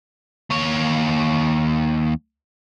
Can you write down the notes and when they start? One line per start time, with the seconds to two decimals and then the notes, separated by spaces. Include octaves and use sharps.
0.50 D#2 C#5